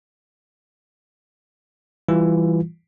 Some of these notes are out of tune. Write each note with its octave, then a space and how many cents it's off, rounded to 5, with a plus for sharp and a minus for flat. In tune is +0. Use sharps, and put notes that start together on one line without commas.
E3 +5 G3 +0 F4 +0